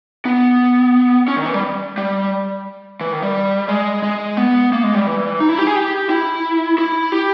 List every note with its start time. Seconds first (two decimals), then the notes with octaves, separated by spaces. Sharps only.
0.26 B3
1.28 C#4
1.37 D#3
1.45 E3
1.54 G3
1.97 G3
3.01 E3
3.12 D#3
3.23 G3
3.68 G#3
4.03 G#3
4.37 B3
4.73 A#3
4.84 G#3
4.94 G3
5.07 E3
5.40 D#4
5.49 E4
5.58 G4
5.67 G#4
5.75 G4
6.10 E4
6.78 E4
7.12 G4